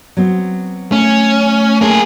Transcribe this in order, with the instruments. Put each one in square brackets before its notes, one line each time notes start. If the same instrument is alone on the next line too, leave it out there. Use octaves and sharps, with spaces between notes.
[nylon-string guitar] F#3 B3 C4
[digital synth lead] A3 [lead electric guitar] C#4
[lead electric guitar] A#3 G#4 [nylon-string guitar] F4